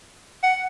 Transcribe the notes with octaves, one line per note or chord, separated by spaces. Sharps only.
F#5